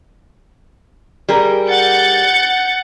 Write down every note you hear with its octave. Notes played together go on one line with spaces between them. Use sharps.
G3 G#4 A#4
F#5 G6 A6 C#7